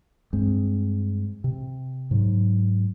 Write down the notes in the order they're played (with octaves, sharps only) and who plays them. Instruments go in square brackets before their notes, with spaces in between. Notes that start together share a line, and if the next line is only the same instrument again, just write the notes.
[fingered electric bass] G2 G#3 C4
C3
G#2 F#3